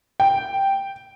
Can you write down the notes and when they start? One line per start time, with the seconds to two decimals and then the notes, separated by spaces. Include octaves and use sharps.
0.20 G5